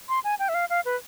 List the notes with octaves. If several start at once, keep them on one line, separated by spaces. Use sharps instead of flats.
C6
G#5
G5
E5
F5
F5
B4